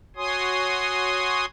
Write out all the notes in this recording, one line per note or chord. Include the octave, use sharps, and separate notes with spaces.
F#4 C#5 G#5 C6 D#6